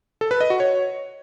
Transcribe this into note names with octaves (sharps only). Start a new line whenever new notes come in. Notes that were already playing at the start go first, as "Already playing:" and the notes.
A4
B4
D#5
F#4
C#5